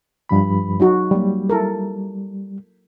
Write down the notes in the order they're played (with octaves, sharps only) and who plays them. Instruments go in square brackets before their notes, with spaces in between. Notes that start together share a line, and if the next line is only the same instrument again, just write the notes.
[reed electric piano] G2 F3 B5
[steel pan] F#3 D#4 F#4
[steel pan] F#3 A#3 [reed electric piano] G3
[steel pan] E4 A4 A#4